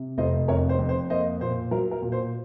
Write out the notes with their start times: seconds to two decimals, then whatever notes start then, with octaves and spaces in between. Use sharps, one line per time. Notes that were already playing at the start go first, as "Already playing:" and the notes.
Already playing: C3
0.18 F1 C5 D#5
0.48 F2 A#4 C#5
0.69 C5
0.79 F2
0.89 C5
1.10 A#3 C5 D#5
1.41 A#2 C5
1.71 F#3 A#4
1.91 A#4
2.02 A#2
2.12 C5